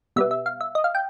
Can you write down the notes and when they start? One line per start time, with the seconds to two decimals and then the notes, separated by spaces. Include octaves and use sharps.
0.16 B2 G3 B3 E5
0.31 E5
0.46 F5
0.61 E5
0.75 D#5
0.84 F5
0.95 G5